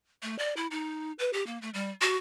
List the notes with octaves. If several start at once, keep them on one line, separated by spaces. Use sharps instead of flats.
A3
D5
E4
D#4
B4
G4
A#3
A3
G3
F#4